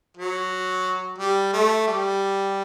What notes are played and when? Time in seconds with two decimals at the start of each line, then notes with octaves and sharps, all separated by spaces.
0.17 F#3
1.19 G3
1.53 A3
1.87 G3